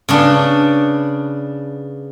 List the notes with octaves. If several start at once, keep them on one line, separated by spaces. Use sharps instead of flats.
C#3 B3 D4